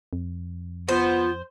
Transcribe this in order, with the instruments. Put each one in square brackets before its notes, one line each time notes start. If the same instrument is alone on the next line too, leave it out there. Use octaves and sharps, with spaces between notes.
[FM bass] F2
[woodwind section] B3 [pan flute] F4 [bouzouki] C5